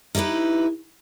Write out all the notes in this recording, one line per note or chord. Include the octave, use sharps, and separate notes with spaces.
D#4 E4 G4 A#4 B4